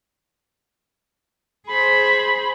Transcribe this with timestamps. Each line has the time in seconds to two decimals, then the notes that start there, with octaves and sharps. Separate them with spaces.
1.67 G#4 C5 B5